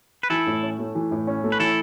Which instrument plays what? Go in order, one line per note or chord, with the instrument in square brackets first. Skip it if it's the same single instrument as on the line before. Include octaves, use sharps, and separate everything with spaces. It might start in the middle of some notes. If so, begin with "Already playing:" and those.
[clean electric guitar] B4
[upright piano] E3 [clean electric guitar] E4 A4
[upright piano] A2
C#4
A3
E3
A2
C#4
A3
[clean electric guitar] B4
[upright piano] E3 [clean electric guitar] E4 A4